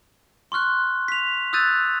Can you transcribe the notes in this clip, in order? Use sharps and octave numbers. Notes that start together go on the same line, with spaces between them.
C6 C#6 F6 F#6
B6 F7
D#6 E6 F#6 G6 A6 D#7